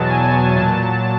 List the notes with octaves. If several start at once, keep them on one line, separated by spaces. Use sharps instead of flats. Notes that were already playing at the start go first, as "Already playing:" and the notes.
Already playing: E2 B2 F#3 A5
G#5
A#2 F#3 A5